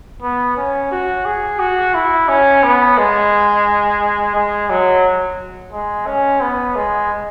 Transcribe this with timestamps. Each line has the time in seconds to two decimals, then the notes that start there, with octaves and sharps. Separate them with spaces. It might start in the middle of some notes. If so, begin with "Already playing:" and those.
0.22 B3
0.57 C#4
0.91 F#4
1.25 G#4
1.59 F#4
1.94 E4
2.28 C#4
2.63 B3
2.97 G#3
4.35 G#3
4.70 F#3
5.72 G#3
6.06 C#4
6.41 B3
6.76 G#3